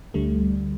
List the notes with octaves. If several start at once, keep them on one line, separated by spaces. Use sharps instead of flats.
D2 D3 G3 A3